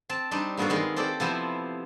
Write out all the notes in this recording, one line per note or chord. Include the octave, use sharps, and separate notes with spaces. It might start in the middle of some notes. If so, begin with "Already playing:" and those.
C4 A5
G3 C4 D4 D#4
G2 A#3 B3 F#4 A4 F5
D#3 G#3 B3 C4
C4 G4 A4 D5
C3 F3 B3 E4 C5 E5